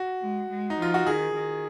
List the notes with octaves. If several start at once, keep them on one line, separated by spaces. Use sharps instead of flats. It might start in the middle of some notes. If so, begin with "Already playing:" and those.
Already playing: F#4
G#3
G#3
D#4
F3 F4
F#4
D#3 G#4
D#3